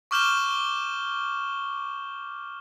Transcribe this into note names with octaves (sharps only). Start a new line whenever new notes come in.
C#6 D6 F6 G6 E7 G7